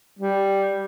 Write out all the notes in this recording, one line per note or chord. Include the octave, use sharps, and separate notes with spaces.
G3